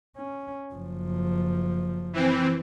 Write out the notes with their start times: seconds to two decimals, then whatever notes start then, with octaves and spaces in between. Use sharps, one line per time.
0.17 C#4
0.74 F#1 F3
2.13 E3 C4